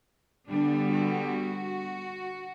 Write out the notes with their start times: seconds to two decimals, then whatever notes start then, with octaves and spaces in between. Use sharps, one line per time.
0.49 D3 G3 B3 D4
0.89 F#4